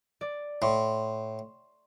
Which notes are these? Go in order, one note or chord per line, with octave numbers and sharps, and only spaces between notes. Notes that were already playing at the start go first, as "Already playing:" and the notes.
D5
A2 C6 C#6